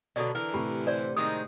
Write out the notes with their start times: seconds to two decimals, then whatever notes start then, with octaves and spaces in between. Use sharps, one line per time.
0.16 B2 D3 F#3 A4 D5
0.35 D3 E3 A#4
0.54 A2 C3 G4 B5
0.87 C5 D5
1.17 D#3 G#3 C4 D#4 D#6